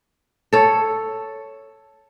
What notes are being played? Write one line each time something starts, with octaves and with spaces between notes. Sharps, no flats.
A4 C#5